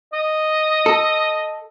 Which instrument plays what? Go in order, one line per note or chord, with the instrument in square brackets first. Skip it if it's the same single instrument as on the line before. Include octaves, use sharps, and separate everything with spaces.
[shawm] D#5
[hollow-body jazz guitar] A4